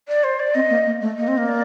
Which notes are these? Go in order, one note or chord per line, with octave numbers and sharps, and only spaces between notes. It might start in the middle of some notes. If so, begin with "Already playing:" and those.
D5
C5
D5
C4 D#5
A#3
A#3
A3
A#3 D#5
C4
A#3
D5